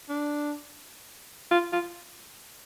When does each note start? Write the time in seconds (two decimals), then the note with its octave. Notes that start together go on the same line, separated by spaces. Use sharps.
0.09 D4
1.51 F4
1.73 F4